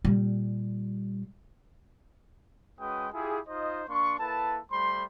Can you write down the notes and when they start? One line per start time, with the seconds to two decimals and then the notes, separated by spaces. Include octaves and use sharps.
0.04 A#2 G3
2.80 G#3 C#4 F#4 B4 G5 D#6
3.13 E4 F4 G4 G#4
3.49 D#4 F4 C5 D#5
3.89 A#3 D4 C6 C#6
4.19 A#3 E4 A4 B4 A5
4.72 G3 A3 C5 B5 C6